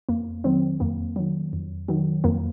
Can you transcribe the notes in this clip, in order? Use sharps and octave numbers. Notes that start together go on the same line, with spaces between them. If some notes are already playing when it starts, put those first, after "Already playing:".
F2 A#3
D#3 F#3 C4
F2 A#3
D#3 F#3
F2
D#3 F#3
F2 A#3